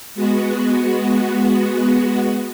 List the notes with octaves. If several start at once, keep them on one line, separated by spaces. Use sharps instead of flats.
G#3 B3 F#4